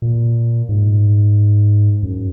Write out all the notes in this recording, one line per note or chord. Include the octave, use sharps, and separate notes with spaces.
A#2
G#2
F#2